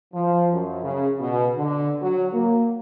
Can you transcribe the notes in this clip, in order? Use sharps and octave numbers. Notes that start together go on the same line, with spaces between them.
F3
F#2
C#3
B2
D3
F#3
A#3